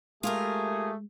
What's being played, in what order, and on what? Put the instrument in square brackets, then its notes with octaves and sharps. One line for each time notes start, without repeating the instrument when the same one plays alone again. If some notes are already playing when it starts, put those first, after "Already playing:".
[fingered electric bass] G#3 [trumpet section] A3 [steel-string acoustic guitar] F4 G4 A#4 [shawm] G#4